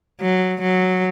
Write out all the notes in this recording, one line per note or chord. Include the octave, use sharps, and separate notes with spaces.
F#3
F#3